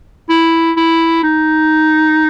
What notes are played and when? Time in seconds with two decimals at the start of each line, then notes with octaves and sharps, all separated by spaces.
0.30 E4
0.77 E4
1.23 D#4